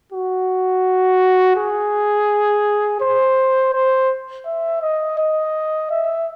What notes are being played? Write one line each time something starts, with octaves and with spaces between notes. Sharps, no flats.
F#4
G#4
C5
C5
E5
D#5
D#5
E5